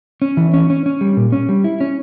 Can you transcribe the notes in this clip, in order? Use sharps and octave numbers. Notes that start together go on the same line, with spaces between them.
C#4
E3
C#4
C#4
C#4
G3
A#2
C#4
G3
E4
C#4